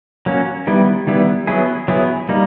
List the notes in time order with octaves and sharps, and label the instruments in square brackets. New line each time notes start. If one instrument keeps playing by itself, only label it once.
[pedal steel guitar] F#3 A#3 C#4
D#3 G3 B3 E4
D#3 G3 B3 E4
F#3 B3 E4 G#4
F#3 B3 E4 G#4
G3 A#3 D#4